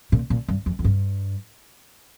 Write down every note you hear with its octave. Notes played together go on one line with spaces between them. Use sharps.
A#2
A#2
G2
F2
F2
G2